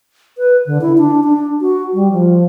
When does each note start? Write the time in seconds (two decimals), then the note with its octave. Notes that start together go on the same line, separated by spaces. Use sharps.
0.38 B4
0.67 D3
0.81 E4
0.98 D4
1.24 D4
1.61 F#4
1.94 G3
2.12 F3